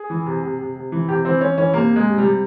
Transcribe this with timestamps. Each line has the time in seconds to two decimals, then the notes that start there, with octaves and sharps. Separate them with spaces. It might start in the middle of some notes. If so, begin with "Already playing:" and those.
Already playing: G#4
0.10 E3
0.26 C3
0.43 C3
0.59 C3
0.76 C3
0.92 E3
1.08 C3 G4
1.25 E3 C4
1.41 E3 C#4
1.57 E3 C#4
1.74 C3 A#3
1.90 C3
1.96 G#3
2.07 C3
2.18 C3 G3